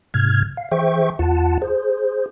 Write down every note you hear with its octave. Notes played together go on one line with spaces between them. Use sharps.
G#2 C3 F6 G#6
F5
E3 G#4 C5 E5 G5 C#6
E2 F4 F#5 A5
G#4 C5